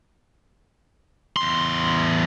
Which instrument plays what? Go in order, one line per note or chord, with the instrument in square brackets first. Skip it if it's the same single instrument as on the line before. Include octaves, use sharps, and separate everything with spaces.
[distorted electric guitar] E2 C6